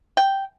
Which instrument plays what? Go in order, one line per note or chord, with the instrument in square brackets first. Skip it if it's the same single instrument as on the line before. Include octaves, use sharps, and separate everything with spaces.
[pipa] G5